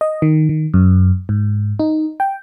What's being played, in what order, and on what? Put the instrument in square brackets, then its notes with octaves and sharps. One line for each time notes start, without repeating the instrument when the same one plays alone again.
[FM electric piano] D#5
D#3
D#3
F#2
G#2
D#4
G5